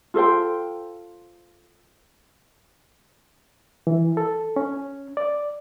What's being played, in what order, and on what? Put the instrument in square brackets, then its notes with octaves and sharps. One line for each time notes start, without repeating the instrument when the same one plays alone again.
[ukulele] F4 A4 C5 G5
[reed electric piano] E3
A4
C#4
D5